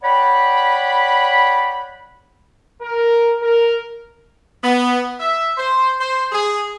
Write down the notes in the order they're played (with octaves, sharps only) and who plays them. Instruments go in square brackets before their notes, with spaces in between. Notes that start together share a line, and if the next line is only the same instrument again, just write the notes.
[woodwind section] C#5 D5 F#5 G5 B5
[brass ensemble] A#4
A#4
[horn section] B3
E5
C5
C5
G#4